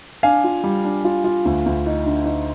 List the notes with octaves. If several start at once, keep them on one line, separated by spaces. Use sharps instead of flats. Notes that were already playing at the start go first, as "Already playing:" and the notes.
D4 F5 G#5
F4
G3
D4
F4
F4
D2
D2
D#4
D3
D#4